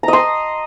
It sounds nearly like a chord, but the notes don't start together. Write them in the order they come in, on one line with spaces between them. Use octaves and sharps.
A#5 D#5 C6